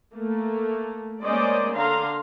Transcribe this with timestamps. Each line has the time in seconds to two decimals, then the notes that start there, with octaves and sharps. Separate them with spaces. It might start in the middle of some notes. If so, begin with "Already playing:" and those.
0.14 A3 A#3
1.23 G#3 A#3 C#4 C5 D5 D#5
1.75 D3 F5 A#5 C6